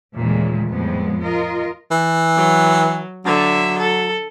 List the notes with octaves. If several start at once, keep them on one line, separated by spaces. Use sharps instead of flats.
D#2 A#2 C#3 E3 G#3 A3
F2 A2 F3 G3 G#3 B3
F4 A#4 D#5
E3
F#3
D3 F#3 E5
A4